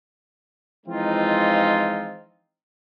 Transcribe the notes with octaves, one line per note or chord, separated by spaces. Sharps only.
E3 F3 G#3 C4 D#4 F4